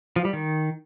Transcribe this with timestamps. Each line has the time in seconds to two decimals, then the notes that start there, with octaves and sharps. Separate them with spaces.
0.16 F3
0.25 G3
0.33 D#3